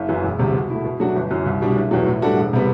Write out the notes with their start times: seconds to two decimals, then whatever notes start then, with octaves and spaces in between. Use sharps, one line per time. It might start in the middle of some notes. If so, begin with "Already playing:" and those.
Already playing: F#1
0.08 F#2 E3
0.23 E1
0.39 D2 C3 G3
0.54 B2
0.70 A3 E4
0.85 B2
1.00 F#3 A3 D4 F#4
1.16 G1
1.31 F#2 E3
1.46 C2
1.62 B2 G3 D4
1.76 F#1
1.91 E2 B2 F#3
2.06 A2
2.22 G3 D4 F#4 A4
2.37 E1
2.53 C3 G3 B3